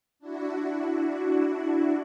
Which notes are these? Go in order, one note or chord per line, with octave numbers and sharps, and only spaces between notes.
D4 E4 F#4